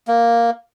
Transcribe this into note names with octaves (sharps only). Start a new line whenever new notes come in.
A#3